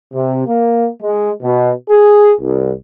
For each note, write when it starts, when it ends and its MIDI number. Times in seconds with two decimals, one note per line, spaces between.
0.13 0.44 48
0.47 0.87 58
1.02 1.31 56
1.42 1.71 47
1.90 2.32 68
2.40 2.72 36